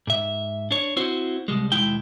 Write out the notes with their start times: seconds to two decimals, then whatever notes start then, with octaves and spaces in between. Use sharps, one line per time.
0.07 G#2 E5
0.71 D4 C#5
0.97 C4 E4 F#4 C5
1.48 C2 G3 G#3
1.72 D#2 B2 G#3 E4 G5